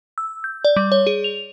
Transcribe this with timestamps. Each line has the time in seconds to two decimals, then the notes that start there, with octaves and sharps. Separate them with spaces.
0.18 E6
0.44 G6
0.65 D5
0.76 G3
0.92 C#5
1.07 G#4
1.24 F7